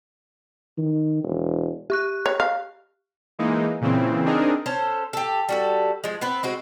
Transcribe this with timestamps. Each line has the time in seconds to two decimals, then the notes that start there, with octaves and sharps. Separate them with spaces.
0.78 D#3
1.23 E1
1.90 G4 C#6 F#6
2.26 C#5
2.40 F5
3.39 E3 G#3 A#3 D#4
3.81 A#2 C#3 E3 C4
4.25 C4 D4 D#4 G#4 A#4
4.66 C#4 A4 C5
5.13 G4 A4
5.49 G3 F#4 A4
6.04 F3 G#3
6.21 B3 C4 B4
6.43 G#3 C4 F#4